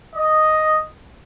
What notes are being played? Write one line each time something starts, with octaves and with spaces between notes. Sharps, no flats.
D#5